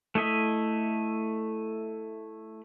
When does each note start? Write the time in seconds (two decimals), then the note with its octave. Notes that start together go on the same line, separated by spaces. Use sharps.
0.15 A3 E4 D#5 E5